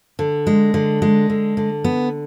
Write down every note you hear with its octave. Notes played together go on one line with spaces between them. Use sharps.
D3
G#3
D3
G#3
D3
D3
B3